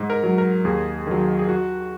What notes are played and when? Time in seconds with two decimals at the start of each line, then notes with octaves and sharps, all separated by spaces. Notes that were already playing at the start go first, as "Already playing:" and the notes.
Already playing: G#2
0.10 A#4
0.24 F#3
0.38 A#4
0.65 D#2 G#4
1.07 D#3 F#3
1.39 G#4
1.49 F#4